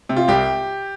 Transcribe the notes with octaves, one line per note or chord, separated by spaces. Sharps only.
C3
F4
C2 G4